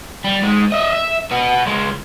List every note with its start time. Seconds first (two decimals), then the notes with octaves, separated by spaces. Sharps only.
0.24 G3
0.43 G#2 G#3
0.72 D#5 E5
0.93 E5
1.31 F#4 B4
1.66 C#2 G#3